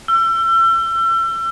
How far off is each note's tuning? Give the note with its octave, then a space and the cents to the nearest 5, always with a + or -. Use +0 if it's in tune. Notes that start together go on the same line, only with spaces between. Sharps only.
E6 +35